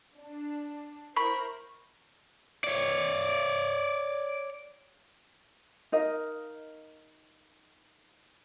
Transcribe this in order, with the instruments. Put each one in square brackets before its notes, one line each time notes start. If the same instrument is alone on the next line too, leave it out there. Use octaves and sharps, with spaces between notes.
[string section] D4
[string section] E4 A#4 C5 [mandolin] B5 [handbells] C#6
[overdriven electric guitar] C#5 D5
[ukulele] D#4 A#4 D#5 F5